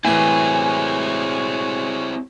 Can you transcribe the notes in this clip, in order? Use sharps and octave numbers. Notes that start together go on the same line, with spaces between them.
A2 E3 G#3 C4 E4 F#4 C#5 G#5